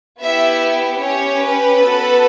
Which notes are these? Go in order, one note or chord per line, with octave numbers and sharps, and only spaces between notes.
B3 E4 G4 E5
C#4 G4 C#5
B4
B3 F#4 A4